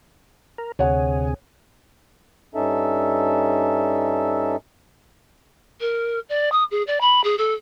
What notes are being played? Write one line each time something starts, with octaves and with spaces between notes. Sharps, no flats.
A#4
D2 C3 G#4 C#5 F#5
G2 C#4 D#4 A4 E5
A#4
D5
D#6
G#4
D5
B5
G#4
A4